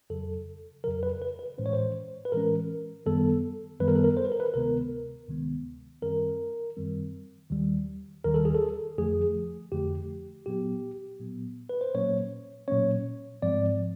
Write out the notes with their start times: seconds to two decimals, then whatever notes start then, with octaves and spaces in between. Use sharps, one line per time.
0.10 F2 C#3 F#3 A4
0.84 F2 C#3 F#3 A#4
1.03 B4
1.22 B4
1.39 B4
1.58 A2 E3 G#3 C#4 C5
1.66 C#5
1.73 C5
2.25 B4
2.32 A2 E3 G#3 C#4 A#4
3.06 F#2 D#3 G3 B3 A4
3.80 F#2 D#3 G3 B3 B4
3.88 A#4
3.95 A4
4.04 A#4
4.17 C5
4.25 B4
4.32 A#4
4.40 B4
4.54 D2 C3 D#3 G#3 B3 A#4
5.28 D2 C3 D#3 G#3 B3
6.02 F#2 D#3 G3 C4 A#4
6.77 F#2 D#3 G3 C4
7.50 D#2 D#3 G3
8.24 D#2 D#3 G3 A#4
8.34 A4
8.45 G#4
8.55 A4
8.98 F2 D3 F3 A3 G#4
9.72 F2 D3 F3 A3 G4
10.46 A#2 F#3 B3 G4
11.20 A#2 F#3 B3
11.69 B4
11.81 C5
11.94 A#2 F#3 A#3 C#4 C#5
12.68 A#2 F#3 A#3 C#4 C#5
13.42 G#2 F3 G#3 C4 D5